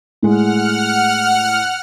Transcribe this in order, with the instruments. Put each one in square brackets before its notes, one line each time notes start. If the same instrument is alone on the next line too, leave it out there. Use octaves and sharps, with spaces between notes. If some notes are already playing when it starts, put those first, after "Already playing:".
[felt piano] A2 G#3 [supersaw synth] F#5 F6